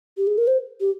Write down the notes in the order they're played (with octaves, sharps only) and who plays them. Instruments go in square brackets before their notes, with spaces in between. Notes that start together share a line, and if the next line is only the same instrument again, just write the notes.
[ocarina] G4
G#4
A#4
C5
G4